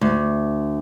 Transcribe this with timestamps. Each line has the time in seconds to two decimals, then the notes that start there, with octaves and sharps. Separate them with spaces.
0.01 D2